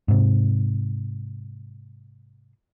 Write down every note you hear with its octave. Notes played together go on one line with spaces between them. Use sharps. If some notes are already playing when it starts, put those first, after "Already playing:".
G#2 C3